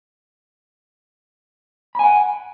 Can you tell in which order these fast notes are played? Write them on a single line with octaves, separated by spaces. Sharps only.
B5 G#5 F#5